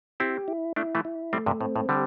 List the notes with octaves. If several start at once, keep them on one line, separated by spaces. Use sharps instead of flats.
C4 E4 G4
E4
A3 D4 E4
E3 A3
E4
G3 A3 C4
G2 C3
A2 C4
A2
D3 G3 G4